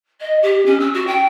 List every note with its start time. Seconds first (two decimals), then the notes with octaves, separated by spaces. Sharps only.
0.20 D#5
0.42 G4
0.65 C#4
0.79 E6
0.93 F#4
1.07 G5